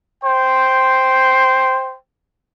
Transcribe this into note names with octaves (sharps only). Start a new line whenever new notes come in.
C5 G5 C6